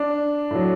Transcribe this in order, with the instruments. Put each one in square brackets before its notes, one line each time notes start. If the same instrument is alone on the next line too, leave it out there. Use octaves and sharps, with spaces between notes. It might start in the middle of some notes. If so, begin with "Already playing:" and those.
Already playing: [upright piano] D4
A2 F#3